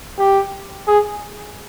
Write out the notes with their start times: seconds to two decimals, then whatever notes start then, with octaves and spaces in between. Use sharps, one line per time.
0.18 G4
0.87 G#4